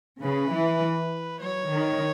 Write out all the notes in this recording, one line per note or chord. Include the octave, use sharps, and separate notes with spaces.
C#3 B4
E3
F#3 C#5
D#3